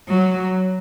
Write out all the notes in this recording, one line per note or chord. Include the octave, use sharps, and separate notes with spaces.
F#3